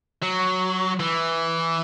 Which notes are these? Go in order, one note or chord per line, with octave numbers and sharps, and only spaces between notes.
F#3
E3